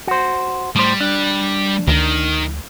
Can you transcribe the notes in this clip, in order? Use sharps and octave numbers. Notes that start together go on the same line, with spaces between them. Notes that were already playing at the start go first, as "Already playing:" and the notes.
F#4 C5
A2 G3 C5
D4
D2 D#3